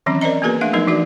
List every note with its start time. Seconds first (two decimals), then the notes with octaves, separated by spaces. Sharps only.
0.06 D#3 E3 F#3 C4 C#4
0.21 A#4 C5 D5 D#5 A#5
0.42 A#3 B3 F#4 G#4 A#4 B4
0.61 A3 D4 E5 F5
0.73 F3 F#3 B3 D#4 A#4
0.88 E3 D#4 F#4 D5